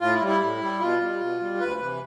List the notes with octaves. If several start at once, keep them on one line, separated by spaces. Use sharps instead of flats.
A2 F4
E4
G3
E4
A2
G3
B2 F4
G3
B2
G3
D2 B4
C3 E3